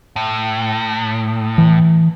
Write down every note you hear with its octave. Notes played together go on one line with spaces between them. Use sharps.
A2
E3